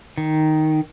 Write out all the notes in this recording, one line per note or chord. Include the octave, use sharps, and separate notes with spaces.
D#3